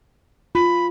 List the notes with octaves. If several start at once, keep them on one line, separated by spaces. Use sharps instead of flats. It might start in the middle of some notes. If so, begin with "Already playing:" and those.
F4 B5